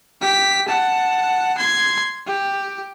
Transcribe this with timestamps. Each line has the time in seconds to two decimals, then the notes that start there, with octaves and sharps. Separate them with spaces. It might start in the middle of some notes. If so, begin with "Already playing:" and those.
0.21 G4 B6
0.68 F#5 A5
1.58 C6 G#6
2.27 G4